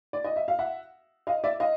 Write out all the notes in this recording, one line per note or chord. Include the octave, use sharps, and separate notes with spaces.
D5
D#5
E5
F5
E5 F#5
D#5 F5
D5 E5
D#5 F5